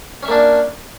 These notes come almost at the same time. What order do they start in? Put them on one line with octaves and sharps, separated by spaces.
C#4 E5 A#3 D4